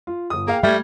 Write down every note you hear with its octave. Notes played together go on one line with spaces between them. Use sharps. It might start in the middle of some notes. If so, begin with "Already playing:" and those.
F4
G1 D#6
A#3 G#4 F5 G5
G3 A3 E5 F6 G#6